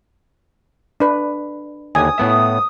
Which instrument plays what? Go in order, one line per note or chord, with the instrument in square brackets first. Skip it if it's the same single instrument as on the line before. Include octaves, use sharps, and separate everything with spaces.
[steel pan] D4 B4
[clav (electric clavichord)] D#2 D3 [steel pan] G#5 [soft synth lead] D#6
[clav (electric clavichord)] A2 B3 E5